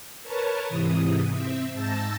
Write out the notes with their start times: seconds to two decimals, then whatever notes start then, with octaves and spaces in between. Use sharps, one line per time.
0.24 A#4 B4 C#5 A5
0.68 G#2 C3 E3 D#6
1.31 C4 E5
1.74 G#2 A5 E6 G6 A6 A#6